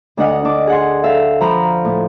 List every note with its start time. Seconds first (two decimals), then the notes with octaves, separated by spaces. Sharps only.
0.17 D2 D4 D#5 F#5 D#6 F6
0.45 D4 D6
0.67 G#4 F#5 C6
1.04 A4 E5 F5
1.40 F3 A#5 B5
1.85 A2